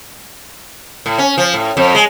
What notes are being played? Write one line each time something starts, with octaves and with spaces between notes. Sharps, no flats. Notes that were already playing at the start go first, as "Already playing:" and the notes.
A2
C#4
F3
A2
F2
G#3